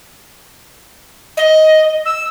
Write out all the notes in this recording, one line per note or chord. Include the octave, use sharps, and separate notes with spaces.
D#5
E6